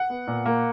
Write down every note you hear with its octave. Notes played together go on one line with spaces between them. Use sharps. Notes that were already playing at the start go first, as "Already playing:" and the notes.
Already playing: F#5
B3
A#2
A#3